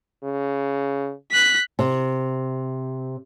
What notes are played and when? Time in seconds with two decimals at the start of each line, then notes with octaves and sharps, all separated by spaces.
0.23 C#3
1.32 F#6 B6
1.79 C3